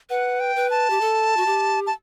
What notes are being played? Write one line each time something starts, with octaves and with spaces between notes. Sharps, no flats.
B4 F#5
G5
B4
A5
G4
A4
F#4
G4
A5